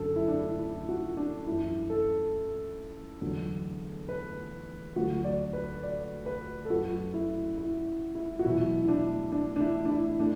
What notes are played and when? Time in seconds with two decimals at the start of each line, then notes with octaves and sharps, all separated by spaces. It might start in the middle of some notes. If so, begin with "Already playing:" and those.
Already playing: F#2 D3 F#3 A4
0.16 E4
0.28 D4
0.40 E4
0.59 E4
0.89 F#4
1.17 D4
1.47 F#2 E3 E4
1.90 A4
3.21 E2 D3 F#3
4.09 B4
4.96 D2 D3 F#3 F#4
5.24 D5
5.53 B4
5.83 D5
6.26 B4
6.65 A4
6.70 F#2 F#3 F#4
7.14 E4
7.57 E4
8.15 E4
8.39 F#4
8.45 E2 B2 F#3 E4
8.84 E4
8.88 D4
9.32 D4
9.56 D4
9.60 E4
9.85 D4
9.90 E4
10.19 A2 D4